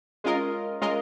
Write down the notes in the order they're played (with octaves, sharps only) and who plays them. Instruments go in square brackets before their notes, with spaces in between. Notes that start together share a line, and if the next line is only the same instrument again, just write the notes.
[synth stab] G#3 C#4 F4 A#4 D#5
G#3 C#4 F4 A#4 D#5